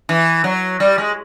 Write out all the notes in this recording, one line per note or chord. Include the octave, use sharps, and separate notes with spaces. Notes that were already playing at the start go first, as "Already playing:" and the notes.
E3
F#3
G3
G#3